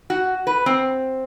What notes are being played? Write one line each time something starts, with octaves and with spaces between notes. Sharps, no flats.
F#4
B4
C4